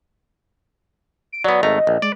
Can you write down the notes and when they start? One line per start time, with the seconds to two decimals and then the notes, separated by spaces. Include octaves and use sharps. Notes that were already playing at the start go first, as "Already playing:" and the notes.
1.32 D7
1.44 F#3 B3 D5
1.63 G#1 A3 D#5 A#5
1.87 A#1
2.02 G#3 D5